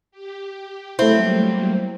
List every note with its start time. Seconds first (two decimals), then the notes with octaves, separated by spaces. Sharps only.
0.11 G4
0.99 F#3 G3 A3 A#3 C4 E4